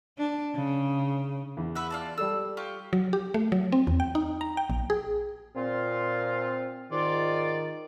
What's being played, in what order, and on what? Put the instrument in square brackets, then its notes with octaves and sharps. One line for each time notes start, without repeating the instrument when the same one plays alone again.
[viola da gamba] D4
C#3
[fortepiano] E2
[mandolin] B4 E5 F#5
F4 D5 A5
[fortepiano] G3 A4 [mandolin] E6
[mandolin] F4 G4 C#6
[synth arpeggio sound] F#3
G4
A3
F#3
C4
E2
G5
D#4
A#5
G5
A#1
G#4
[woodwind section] A#2 F4 [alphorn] C4
[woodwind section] G#2 F4 D5 [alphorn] D#3